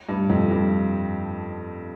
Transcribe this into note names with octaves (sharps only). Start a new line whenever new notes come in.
G2
F2
G2